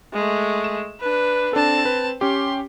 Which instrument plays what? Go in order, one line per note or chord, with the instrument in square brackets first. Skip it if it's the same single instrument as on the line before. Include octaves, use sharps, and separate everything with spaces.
[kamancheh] G#3 A3
[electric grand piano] E7
[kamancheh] D4 B4
[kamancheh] C4 A5 [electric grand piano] D4 A4
[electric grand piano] B4
[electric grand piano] C#4 G4 [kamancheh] C6